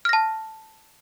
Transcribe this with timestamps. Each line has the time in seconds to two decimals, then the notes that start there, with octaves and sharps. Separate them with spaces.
0.05 F6
0.09 A#6
0.13 A5